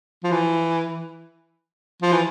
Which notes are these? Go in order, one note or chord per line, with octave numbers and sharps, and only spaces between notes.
F3
E3
F3
E3